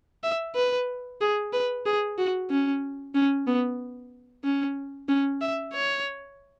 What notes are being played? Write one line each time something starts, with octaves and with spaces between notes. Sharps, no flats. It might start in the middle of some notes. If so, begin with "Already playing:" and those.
E5
B4
G#4
B4
G#4
F#4
C#4
C#4
B3
C#4
C#4
E5
C#5